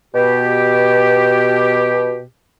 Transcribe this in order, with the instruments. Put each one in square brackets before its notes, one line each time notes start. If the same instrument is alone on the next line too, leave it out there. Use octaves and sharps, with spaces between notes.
[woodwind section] B2 G4